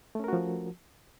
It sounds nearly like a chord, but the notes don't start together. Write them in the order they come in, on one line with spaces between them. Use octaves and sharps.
A3 C#4 A#4 F#4 F3